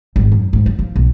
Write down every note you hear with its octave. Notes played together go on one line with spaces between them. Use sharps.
G#1
F#2
G#2
E3
F3
B1